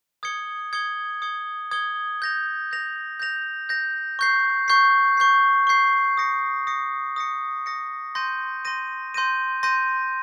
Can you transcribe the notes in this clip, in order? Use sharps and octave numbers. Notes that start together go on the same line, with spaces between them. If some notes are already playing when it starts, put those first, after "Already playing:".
D#6 G#6 C#7 G7
D#6 G#6 C#7 G7
D#6 G#6 C#7 G7
D#6 G#6 C#7 G7
G6 A#6 F7
G6 A#6 F7
G6 A#6 F7
G6 A#6 F7
C#6 G6 C7
C#6 G6 C7
C#6 G6 C7
C#6 G6 C7
D#6 A#6 C#7
D#6 A#6 C#7
D#6 A#6 C#7
D#6 A#6 C#7
C6 G6 A#6 D#7
C6 G6 A#6 D#7
C6 G6 A#6 D#7
C6 G6 A#6 D#7